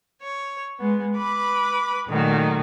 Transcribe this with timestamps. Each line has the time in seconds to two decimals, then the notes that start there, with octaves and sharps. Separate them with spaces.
0.22 C#5
0.79 G#3 B3
1.17 B4 B5 D6
2.08 A#2 D#3 F#3 A3